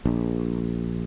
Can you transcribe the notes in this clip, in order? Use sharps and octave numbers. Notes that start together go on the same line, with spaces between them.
A#1